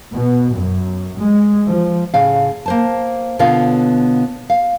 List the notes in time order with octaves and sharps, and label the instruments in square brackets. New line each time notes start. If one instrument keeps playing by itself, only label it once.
[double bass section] B2
F#2
G#3
F3
[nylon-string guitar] A2 C#3 F5
A#3 C5 A5
B2 D3 B3 F4 C#5 F5
F5